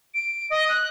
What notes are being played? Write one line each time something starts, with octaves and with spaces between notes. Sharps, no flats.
D7
D#5
F#6